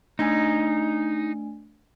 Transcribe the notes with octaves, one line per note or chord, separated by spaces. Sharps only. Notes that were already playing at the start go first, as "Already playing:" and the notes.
A3 D4 D#4 G#5